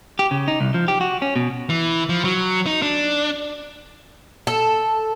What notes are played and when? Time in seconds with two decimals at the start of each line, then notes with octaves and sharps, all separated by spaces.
0.19 G4
0.31 C#3
0.48 D#4
0.61 C2
0.74 F3
0.88 G4
1.01 F#4
1.22 C#4
1.36 B2
1.70 E3
2.09 F3
2.24 F#3
2.66 D#4
2.82 D4
4.47 A4